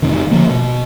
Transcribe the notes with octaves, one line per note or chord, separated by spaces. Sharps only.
A1 F2 C3 D#3
D3 F3 A#3
B2